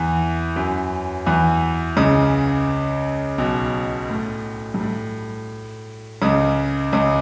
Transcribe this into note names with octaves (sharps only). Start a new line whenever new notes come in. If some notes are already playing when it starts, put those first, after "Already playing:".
Already playing: E2 E3
F#2 F#3
E2 E3
C#2 C#3
B1 B2
A2
G2
A2
C#2 C#3
C#2 C#3